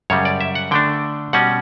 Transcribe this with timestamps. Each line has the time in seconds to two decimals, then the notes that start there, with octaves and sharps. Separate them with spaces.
0.10 F#2 C#3 G3 C#5
0.25 D5
0.41 E5
0.55 F#5
0.71 D3 A3 D4 G5
1.33 B2 G3 C#4 F#5